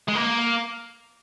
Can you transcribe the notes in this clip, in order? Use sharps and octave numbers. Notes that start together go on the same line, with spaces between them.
G#3
A#3